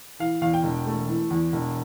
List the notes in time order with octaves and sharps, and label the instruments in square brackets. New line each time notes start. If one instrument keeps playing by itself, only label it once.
[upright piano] E3 F5
E2 F5
G5
E1
A3
E3
E2
E1